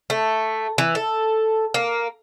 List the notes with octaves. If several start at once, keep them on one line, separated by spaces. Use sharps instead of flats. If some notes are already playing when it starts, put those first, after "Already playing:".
A3
E3
A4
A#3